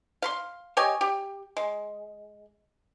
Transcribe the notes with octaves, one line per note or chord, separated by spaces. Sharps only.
F5 B5 C6
G4 C#5 D#5 G#5
G4
G#3